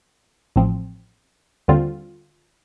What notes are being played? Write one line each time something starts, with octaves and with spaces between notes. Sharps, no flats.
A1 A2 F3 C4
D#2 D3 G3 C4 F4